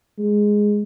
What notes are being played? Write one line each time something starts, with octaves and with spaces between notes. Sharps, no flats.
G#3